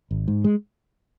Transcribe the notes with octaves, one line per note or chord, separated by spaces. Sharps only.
G#1
G#2
G#3